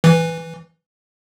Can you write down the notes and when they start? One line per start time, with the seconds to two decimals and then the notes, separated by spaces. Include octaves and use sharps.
0.04 E3